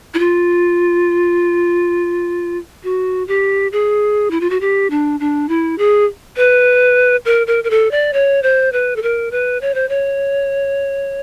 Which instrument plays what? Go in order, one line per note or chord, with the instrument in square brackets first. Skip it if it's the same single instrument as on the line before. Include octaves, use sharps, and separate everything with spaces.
[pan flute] E4
F4
F#4
G4
G#4
E4
F4
F#4
G4
D4
D4
E4
G#4
B4
A#4
A#4
A#4
A4
D5
C#5
C5
B4
A4
A#4
B4
C#5
C5
C#5